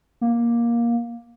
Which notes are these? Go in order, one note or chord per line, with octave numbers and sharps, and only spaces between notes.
A#3